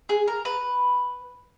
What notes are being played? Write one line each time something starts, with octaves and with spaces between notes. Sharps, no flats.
G#4
A#4
B4